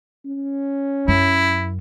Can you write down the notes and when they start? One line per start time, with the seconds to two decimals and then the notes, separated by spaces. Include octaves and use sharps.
0.25 C#4
1.08 F#2 E4